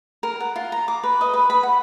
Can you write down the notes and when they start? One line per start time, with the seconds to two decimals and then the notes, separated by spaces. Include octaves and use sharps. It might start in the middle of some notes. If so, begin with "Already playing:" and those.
0.23 A#4
0.40 F#5
0.56 F4
0.72 A#5
0.88 D6
1.03 B4
1.21 D#5
1.34 B4
1.50 B5
1.63 F#5